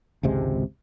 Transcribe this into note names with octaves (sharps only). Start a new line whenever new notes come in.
G#1 C#2 C3 G#3